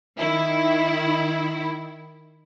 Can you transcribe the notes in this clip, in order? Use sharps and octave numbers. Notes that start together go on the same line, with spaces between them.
D#3 E4